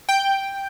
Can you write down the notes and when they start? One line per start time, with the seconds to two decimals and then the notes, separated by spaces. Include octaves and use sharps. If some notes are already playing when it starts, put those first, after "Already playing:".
0.09 G5